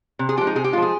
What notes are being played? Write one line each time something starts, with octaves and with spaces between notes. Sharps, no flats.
C3
G#4
F3 G#3 G4
D#4
C3 G#4
G4
F3 G#3 F4 G#4